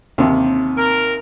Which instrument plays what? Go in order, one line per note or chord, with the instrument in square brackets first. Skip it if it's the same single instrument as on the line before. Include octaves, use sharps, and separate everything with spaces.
[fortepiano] D#2 C3
[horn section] A#4